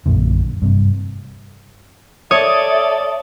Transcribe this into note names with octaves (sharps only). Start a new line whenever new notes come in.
A#1 F#2 A#2 D3
G2 C3
A4 C#5 D5 E5 D#6